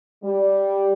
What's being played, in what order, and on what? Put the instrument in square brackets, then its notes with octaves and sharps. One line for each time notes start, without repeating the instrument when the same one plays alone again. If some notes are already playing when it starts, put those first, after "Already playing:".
[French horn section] G3